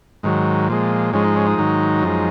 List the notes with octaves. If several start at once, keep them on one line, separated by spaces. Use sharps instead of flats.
G#2 D#3 F#3
A#2 F3 G#3
G#2 F3 G#3 C#4
D#4
C#4
D#4
G#2 D#3 F#3
F#2 F3 G#3